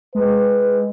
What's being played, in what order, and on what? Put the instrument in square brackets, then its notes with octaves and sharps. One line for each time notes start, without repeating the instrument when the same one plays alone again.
[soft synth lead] G#3 [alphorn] B4